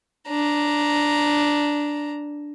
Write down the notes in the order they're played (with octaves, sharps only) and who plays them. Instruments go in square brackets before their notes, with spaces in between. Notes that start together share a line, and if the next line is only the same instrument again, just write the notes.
[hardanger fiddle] D4 A#5